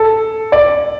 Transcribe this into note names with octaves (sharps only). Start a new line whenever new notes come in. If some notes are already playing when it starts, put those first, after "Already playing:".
Already playing: A4
D5